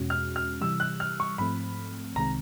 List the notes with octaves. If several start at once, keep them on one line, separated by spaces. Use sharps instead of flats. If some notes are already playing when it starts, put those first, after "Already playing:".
Already playing: E2 B2 G#3 C#4 F#4
F6
F6
C3 E3 G3 E6
F#6
F6
C#6
G#2 F3 A3 C4 B5
C2 C3 D#3 G#3 C4 A#5